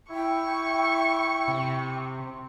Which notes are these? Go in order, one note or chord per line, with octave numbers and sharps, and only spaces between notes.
E4 G5 C#6
C3